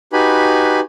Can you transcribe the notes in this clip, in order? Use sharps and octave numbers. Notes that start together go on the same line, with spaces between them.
D#4 F#4 G4 B4 G#5 B5